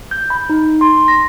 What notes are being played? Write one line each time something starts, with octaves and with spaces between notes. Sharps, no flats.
G6
B5
D#4
C6
A#6